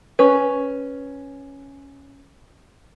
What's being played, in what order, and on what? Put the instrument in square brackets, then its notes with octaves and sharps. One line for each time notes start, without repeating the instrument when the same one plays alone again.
[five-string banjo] C#4 B4